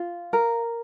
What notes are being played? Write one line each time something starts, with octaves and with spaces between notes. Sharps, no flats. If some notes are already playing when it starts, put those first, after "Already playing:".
Already playing: F4
A#4